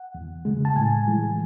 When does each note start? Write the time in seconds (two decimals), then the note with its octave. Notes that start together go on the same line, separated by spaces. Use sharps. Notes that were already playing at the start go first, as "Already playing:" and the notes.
Already playing: F#5
0.15 E2
0.45 C#3 G#3
0.65 A5
0.76 A2 G#5
1.08 E3 G#3